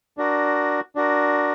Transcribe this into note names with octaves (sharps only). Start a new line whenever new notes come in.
D4 F#4 A#4
D4 F#4 A#4